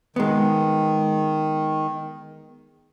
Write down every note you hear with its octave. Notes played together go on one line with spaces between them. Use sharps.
D#3 G#3 B3